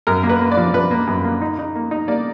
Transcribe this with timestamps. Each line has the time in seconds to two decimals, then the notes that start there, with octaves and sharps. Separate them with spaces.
0.07 F#2 A#4
0.23 A#3
0.29 B4
0.41 A#3
0.51 D5
0.57 F3
0.73 F3 B4
0.91 A#3
1.07 F#2
1.24 A#3
1.42 D#4
1.59 D#4
1.75 A#3
1.91 D#4
2.08 A#3 D5